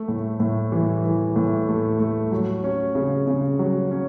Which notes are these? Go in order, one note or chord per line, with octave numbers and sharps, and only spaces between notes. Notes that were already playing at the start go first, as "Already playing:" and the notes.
Already playing: A3
A2
A2
E3
E3
A2
A3
A3
F#3
C#4
C#3
C#3
F#3
C#4